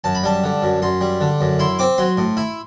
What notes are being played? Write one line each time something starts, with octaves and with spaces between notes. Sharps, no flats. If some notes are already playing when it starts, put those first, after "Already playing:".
F#2 A5
B5
G3 A5
D3
F#2
F#2 C6
G3
D3
F#2
E4 C6
C4 D6
F#3 C6
A2
E4